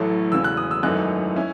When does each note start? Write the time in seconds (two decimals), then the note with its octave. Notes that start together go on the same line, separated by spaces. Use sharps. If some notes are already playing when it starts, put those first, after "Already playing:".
Already playing: A1 A2 F#3 A3
0.32 E1 E2 C#3 E6
0.44 F#6
0.57 D#6
0.71 E6
0.83 G#1 F#2 E3 A3 D#4 F#6
1.36 C#4 E4